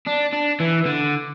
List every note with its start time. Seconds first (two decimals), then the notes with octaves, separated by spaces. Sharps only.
0.07 D4
0.33 D4
0.60 E3
0.86 D3